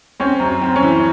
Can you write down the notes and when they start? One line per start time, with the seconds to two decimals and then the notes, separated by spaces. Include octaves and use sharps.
0.20 C4 C#4
0.40 F#2
0.61 C4
0.76 C#4
0.83 E3